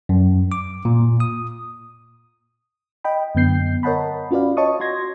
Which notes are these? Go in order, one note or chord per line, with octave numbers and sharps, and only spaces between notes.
F#2
D6
A#2
D#6
D#5 G5 B5
F#2 D3 B3 G6 C7
A#4 C#5 D#5 F#5 A5 B5
C#4 F4 F#4 B4 D5 F5
C#5 D#5 A5 C#6 D#6
F#4 C6 G#6 A#6